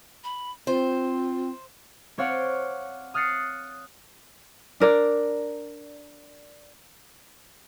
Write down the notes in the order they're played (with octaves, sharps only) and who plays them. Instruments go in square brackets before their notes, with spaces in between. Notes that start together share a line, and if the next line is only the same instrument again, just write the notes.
[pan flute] B5
[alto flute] C4 [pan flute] F4 [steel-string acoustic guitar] C5
[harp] C4 C#5 D5 F5 F#5
D#6 F6 F#6 A6 C7 C#7
[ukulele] D4 A#4 D5